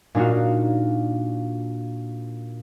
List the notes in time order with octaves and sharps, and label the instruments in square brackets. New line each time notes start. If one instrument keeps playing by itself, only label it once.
[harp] A#2 D4 D#4 F4 F#4